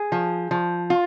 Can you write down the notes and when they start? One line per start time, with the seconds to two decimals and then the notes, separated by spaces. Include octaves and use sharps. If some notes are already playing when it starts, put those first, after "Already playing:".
Already playing: G#4
0.12 F3
0.51 F3
0.90 F4